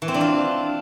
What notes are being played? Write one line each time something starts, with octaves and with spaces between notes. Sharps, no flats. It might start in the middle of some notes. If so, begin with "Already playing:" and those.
E3
C4
D4
F4